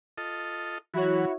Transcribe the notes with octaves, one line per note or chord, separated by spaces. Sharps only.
F4 A4 D#5
E3 F#3 E4 F#4 C#5